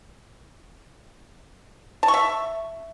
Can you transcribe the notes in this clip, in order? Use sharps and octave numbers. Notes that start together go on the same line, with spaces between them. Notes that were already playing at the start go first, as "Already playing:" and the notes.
A5
C#6
E5